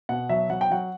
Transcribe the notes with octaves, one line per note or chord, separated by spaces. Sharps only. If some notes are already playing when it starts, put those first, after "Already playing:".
B2 F#5
F#3 E5
F#3 F#5
G5
F#3 F#5